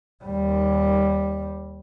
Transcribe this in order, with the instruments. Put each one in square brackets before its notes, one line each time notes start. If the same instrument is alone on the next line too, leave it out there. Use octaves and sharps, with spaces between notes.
[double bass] D#2 G3